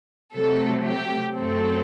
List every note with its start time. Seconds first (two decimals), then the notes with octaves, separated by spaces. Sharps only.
0.34 C3 F#3 A3 A4
0.86 G4
1.36 F#2 F#3 A3 C4 A4